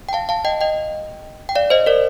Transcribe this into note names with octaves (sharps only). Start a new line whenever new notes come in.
G5
F5 A5
F5 A5
D#5 G5
D#5 G5
G5
D5 F5
C5 D#5
A#4 D5